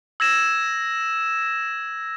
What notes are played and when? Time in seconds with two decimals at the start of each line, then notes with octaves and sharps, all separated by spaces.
0.20 E6 G#6 A#6 E7